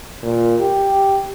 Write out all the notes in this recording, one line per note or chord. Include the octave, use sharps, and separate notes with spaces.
A#2
G4